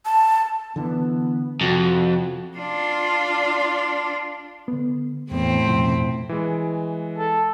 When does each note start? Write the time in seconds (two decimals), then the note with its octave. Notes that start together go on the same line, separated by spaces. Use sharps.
0.05 A5
0.76 D3 E3 B3
1.61 F2 C3 F#4
2.57 D4 F4
4.68 D3 B3
5.31 E2 A2 E3 B3 C4
5.67 F2 B2 F3
6.29 E3 G#3
7.18 A4